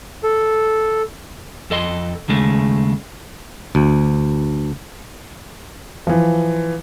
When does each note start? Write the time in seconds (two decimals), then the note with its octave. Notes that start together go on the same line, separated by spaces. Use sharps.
0.24 A4
1.70 F2 A4 D#5 C6
2.28 D#2 C#3 G#3 A3
3.75 D2
6.07 E3 F3